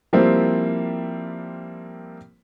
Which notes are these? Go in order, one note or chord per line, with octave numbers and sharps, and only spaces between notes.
F3 G3 A#3 C4 E4